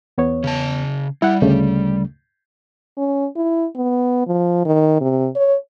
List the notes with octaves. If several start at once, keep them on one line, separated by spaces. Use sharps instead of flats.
E2 B3 C#5
C#3 A5
G3 E4 F#5
D2 C#3 A3
C#4
E4
B3
F3
D#3
C3
C#5